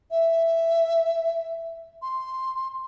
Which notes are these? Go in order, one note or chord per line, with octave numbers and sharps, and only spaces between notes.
E5
C6